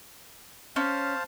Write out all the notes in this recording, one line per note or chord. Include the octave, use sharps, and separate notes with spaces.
C#4 C5 F5 A5